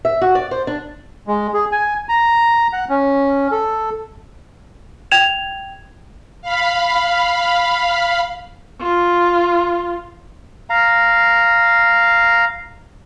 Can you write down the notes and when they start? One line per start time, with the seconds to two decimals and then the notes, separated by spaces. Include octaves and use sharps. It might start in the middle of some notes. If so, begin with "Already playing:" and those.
0.05 E5
0.22 F#4
0.35 D5
0.51 C5
0.67 D4
1.27 G#3
1.54 G#4
1.72 G#5
2.09 A#5
2.73 F#5
2.89 C#4
3.51 A4
5.11 G5 G#6 E7 F7
6.42 F5 B5
8.81 F4
10.70 F5 A#5